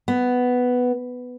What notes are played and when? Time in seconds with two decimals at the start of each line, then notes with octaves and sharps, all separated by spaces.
0.08 B3